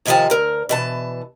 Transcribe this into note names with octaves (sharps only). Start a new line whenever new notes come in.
D#2 C3 D#3 F3 G#5 A5
D2 A#4
B2 E3 A5